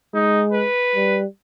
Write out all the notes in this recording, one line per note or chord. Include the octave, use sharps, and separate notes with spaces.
G#3 D#4
B4
G3